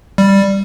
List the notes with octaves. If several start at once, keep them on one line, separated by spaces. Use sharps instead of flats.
G3